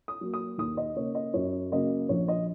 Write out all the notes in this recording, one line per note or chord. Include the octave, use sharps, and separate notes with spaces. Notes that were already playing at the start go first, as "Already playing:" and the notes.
D#6
F#3 A#3
D#6
D#2 D#6
D#5
C#3 A#3 C#5
D#5
F#2 C#5
C#3 F#3 A#3 D#5
A#1 C#5
D#5